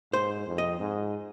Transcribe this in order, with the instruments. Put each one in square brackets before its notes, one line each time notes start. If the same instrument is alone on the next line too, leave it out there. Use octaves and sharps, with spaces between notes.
[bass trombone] G#2 [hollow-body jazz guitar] C5
[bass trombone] F2
[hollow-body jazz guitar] D#5
[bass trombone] G#2